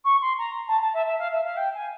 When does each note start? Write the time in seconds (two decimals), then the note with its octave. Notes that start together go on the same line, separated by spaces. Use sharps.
0.04 C#6
0.21 C6
0.38 A#5
0.68 A5
0.81 A5
0.93 E5
1.06 E5
1.18 F5
1.31 E5
1.44 F5
1.56 G5
1.74 G#5